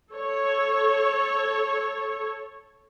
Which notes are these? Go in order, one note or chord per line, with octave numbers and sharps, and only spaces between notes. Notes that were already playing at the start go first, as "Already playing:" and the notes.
A4 C#5